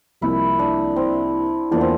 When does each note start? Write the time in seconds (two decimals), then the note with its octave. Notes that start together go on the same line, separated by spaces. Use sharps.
0.21 C2 C3 F3 A#3 E4
0.59 D4
0.96 C4
1.71 E2 E3 A#3 D4 F4 C5
1.81 C4